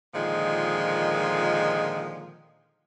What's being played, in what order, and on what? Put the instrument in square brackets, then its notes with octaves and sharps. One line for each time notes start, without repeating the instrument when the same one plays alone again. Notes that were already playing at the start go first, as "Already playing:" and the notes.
[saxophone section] A#2 D3 D#3 F3 G#3